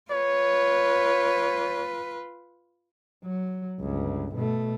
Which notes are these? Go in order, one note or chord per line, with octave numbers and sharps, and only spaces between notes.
F4 B4 C#5
F#3
G1 C#2
B2 A3